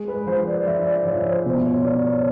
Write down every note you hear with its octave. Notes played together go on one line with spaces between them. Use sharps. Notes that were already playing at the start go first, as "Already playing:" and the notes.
Already playing: G#3
B4
F3 C5
D5
F3 E5
D5
F3 C#5
C5
B2 C5
C#5
B3 D5
C#5